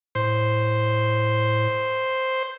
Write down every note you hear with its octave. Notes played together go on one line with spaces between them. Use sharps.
A2 C5